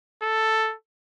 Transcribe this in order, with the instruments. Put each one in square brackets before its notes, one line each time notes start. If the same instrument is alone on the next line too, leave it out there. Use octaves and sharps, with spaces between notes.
[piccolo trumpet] A4